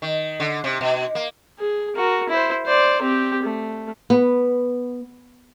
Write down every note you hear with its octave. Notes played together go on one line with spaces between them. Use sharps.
D#3
D3
C3
B2
A#3
G#4
F#4 A#4
E4 C5
C5 D5
C4 G4
A3
B3